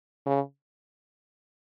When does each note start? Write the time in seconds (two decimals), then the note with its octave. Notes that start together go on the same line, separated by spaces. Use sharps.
0.26 C#3